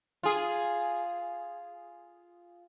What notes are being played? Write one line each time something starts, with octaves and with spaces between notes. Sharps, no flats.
F4 G#4